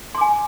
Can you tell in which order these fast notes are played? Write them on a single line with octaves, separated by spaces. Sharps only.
C6 D6 G#5